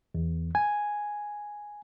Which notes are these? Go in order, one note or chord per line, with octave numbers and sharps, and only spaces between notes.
E2
G#5